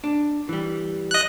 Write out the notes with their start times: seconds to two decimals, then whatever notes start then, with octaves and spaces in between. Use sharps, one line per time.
0.04 D4
0.49 E3 G3
1.11 D#5 F#6